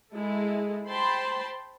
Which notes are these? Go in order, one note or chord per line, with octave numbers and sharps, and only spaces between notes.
G#3 E4 A4
C5 G5 A5 B5 C6